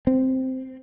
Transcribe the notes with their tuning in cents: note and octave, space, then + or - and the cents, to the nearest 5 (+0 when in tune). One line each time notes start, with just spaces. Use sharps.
C4 -5